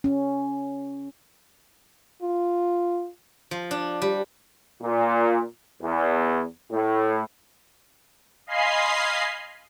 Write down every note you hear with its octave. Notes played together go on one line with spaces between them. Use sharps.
C#4
F4
F3
D4
G3
A#2
E2
A2
D#5 F5 G#5 B5 C6 C7